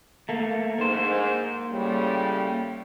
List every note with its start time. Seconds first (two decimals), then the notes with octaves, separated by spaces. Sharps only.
0.29 A3 A#3
0.78 G#2 A#3 C5
1.72 A2 C#3 G3